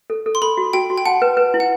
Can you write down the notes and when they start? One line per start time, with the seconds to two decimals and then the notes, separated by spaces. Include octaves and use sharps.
0.10 A4
0.26 A4
0.35 C6
0.42 A4 B5
0.58 F#4
0.73 F#4 G5
0.90 F#4
0.98 G5
1.06 F#5 A5
1.22 B4
1.37 B4
1.54 E4
1.60 F#5